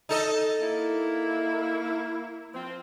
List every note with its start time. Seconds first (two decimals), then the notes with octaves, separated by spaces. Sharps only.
0.09 D#4 A4 D#5
0.62 A#3 E4
2.54 F3 C4